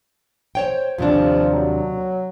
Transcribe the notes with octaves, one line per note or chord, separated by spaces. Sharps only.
C5 C#5 G5
D#2 C3 F3 D4
F#3